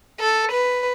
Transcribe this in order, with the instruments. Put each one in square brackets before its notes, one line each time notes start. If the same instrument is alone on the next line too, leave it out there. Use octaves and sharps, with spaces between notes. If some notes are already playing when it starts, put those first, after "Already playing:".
[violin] A4
B4